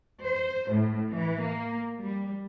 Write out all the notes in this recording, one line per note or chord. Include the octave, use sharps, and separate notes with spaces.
C5
A2
E3
A#3
G3